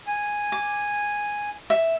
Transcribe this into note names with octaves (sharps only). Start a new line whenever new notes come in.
G#5
D6
E5